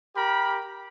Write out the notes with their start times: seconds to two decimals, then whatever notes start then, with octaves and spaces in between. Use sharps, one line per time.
0.16 G4 A#4 B5